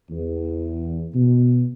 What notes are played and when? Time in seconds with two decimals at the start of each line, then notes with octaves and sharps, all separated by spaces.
0.11 E2
1.13 B2